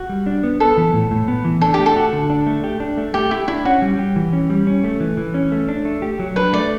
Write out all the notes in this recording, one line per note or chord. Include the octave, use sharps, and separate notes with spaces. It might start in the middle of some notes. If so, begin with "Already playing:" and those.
Already playing: F#4
G3
D4
B3
B3 A4
E3
A2
A2
B3
E3
D4 A4
G4
A3
A4
F#4
D3
D4
A3
G4
D4
A3
A3 G4
E4 G4
D4 E4
C#4 F#4
G3
G4
E3
C#4
G3
C#4
A3
E3
E3
C#4
A3
D4
A3
G4
F#3
D4 B4
A3 D5